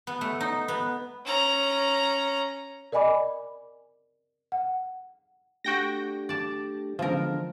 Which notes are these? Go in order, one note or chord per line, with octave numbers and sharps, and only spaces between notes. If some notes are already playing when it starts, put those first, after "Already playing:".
B3
A3
D#4
B3
C#4 A#5
A#4 D5 D#5 G#5 B5 D6
F#5
A3 D4 F#4 G4 G5 A#6
D5 A5
D3 E3 F3 G#3 B3 A#4 F5